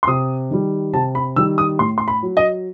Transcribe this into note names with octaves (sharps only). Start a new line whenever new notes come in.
C6
C3 D#6
D#3 G3
C3 A5
B5
D#3 G3 E6
D#6
A2 C6
C6
B5
F#3
D#5